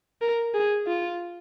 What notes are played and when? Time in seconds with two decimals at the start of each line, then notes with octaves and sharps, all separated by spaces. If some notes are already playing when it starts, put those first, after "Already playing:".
0.22 A#4
0.54 G#4
0.87 F4